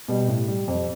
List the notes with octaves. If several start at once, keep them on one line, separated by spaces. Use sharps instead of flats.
B2 G3
A2
G3
F2